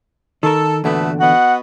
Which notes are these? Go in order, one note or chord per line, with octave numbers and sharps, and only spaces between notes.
D#3 A4 A#4
E2 A#2 D3 A3 B3 F#4
B3 F#4 D#5 F#5